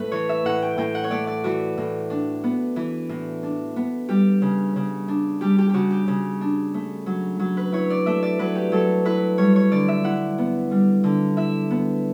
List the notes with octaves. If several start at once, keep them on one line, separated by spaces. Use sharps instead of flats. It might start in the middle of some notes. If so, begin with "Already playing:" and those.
Already playing: A2 A3 A4 B4
E3 C#5
E5
A2 F#5
G5
A2 G5
F#5
C#5
A3 D5
D5
E3 F#4
A2
D4
B3
E3
A2
D4
B3
G3 G4
C#3
C#3
D4
G3 G4
G4
C#3 F#4 G4
G4
C#3
D4
A3
F#3
F#3
B4
E4 C#5
D5
A3 E5
D5
F#3 B4
G4
F#3 A4
E4 B4
G3 C#5
C#5
D3 D5
E5
E4 F#5
B3
G3
D3
E4 E5
B3